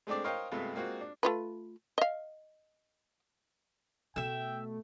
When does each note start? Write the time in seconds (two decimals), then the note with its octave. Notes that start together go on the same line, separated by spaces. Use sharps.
0.07 G#3 A3 C4 D4 D5
0.24 A#4 C5 C#5 D#5 F5 G5
0.51 G2 C3 G#3 A3 B3 F4
0.75 G#3 A#3 C4 F4 F#4
1.01 D4
1.23 A3 F4 B4
1.98 D#5 F5
4.16 B2 A3 E5 G5 E6